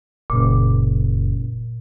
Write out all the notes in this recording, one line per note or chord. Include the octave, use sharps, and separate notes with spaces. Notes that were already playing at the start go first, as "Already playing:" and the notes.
F#1 A#2